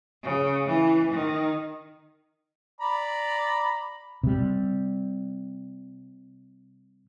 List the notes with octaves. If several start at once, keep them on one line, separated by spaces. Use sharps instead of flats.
C#3
E3
D#3
D5 A#5 B5
C3 G3